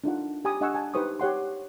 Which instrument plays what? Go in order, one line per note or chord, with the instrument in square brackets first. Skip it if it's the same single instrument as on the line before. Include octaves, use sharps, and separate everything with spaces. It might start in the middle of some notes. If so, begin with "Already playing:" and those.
[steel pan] D4 D#4 F4 F#5
G4 G#5 B5 D#6
D4 D#5 F#5 G#5 C#6 E6
G#5 A5
D#4 G4 B4 C5 C#6 D#6
G4 C#5 F#5 C6